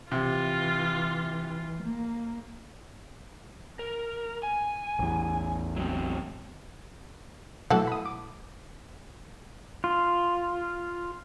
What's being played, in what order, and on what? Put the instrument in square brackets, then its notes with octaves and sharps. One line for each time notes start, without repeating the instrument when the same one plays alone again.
[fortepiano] C3 [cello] E3 [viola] F4
[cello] A#3
[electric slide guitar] A#4
G#5
[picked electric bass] A1 E2
[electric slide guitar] F#3 G#3 C4
[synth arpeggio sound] B2 F#3 A3 [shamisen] E3 A4 F#5
[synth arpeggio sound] B5 D#6
D6
[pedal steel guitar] F4